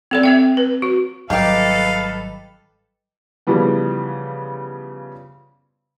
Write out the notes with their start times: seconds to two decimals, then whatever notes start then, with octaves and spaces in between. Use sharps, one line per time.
0.11 C4 A4 D5
0.23 C4 E5 G5
0.57 B4
0.82 F#4
1.30 G#1 F#3 G3 D#4 G4 A4 B4 F5
3.47 C#3 E3 F3 G3 B3